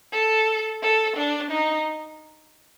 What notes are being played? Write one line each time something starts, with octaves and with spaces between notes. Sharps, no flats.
A4
A4
D4
D#4